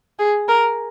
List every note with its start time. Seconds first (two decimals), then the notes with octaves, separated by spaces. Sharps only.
0.19 G#4
0.48 A#4